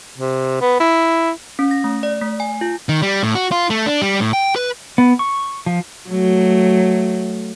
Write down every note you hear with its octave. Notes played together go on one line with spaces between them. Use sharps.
C3
B3
E4
C#4
A#6
A3
D5
A3
G#5
F4
D#3
G3
A2
F#4
F4
A3
D4
G3
A2
G5
B4
B3
C#6
F3
F#3 A3